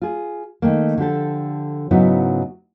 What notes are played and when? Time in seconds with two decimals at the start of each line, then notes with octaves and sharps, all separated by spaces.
0.01 F4 G#4
0.62 D#3 A3 A#3
0.98 D3 F3 G4 A4
1.91 G#2 C#3 F#3 B3 D#4 E4